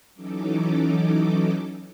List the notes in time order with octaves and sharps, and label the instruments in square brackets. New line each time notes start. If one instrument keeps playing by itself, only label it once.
[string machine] E3 F#3 C#4 D#4 A4 D6